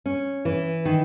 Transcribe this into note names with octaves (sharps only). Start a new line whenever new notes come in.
C#4
E3
D#3